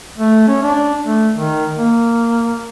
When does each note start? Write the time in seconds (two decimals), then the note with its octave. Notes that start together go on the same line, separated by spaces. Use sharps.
0.17 A3
0.48 C#4
0.63 D4
1.05 A3
1.35 D#3
1.78 A#3